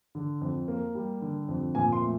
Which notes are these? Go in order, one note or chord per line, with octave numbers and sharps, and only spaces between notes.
D3
F2
A#3
G3
D3
F2
A#2 G#5
C6
A3